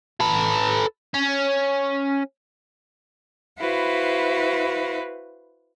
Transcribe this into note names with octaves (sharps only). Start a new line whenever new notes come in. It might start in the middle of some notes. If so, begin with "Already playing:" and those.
A4 B4
C#4
E4 F#4 B4 C5 F5